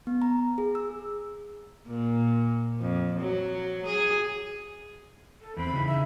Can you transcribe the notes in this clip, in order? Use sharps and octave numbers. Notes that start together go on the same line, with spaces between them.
B3
A#5
G#4
E6
A#2
F2
F#3
G#4
A4
E2 C4 B5
C#3 D#4 E4
E5